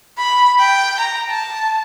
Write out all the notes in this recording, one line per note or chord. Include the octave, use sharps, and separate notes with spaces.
B5
G5
A#5
A5